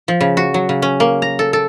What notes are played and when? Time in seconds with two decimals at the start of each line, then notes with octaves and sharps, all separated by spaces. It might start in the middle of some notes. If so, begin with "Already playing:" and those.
0.08 F3
0.21 C#3
0.37 F#4
0.54 F#3
0.69 C#3
0.82 C#4
1.00 A#3
1.22 A#5
1.39 A4
1.53 A4